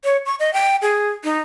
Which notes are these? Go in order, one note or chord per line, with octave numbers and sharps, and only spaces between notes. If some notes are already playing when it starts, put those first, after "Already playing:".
C#5
C#6
D#5
G5
G#4
D#4